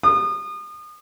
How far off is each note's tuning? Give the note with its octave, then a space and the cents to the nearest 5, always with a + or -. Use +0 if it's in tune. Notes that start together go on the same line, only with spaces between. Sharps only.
D#6 -35